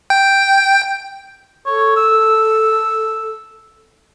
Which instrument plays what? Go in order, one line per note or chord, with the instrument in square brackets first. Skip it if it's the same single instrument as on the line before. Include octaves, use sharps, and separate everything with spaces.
[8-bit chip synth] G5
[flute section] A4 [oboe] C#5
[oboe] E6